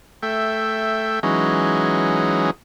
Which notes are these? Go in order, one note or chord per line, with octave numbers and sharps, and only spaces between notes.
A3 E5 G5
E3 F#3 G#3 C#4 D#4